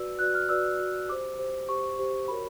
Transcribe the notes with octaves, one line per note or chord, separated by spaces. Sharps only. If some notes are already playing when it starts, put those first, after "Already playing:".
Already playing: F#4 B4 D5 E6
F#4 B4 D5 F#6
F6
F#4 B4 D5 E6
F#4 B4 D5
G4 C5 D6
G4 C5
G4 C5 C#6
G4 C5
F#4 A#4 C#5 B5